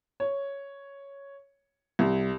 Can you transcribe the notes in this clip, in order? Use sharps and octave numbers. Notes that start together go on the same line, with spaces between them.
C#5
C2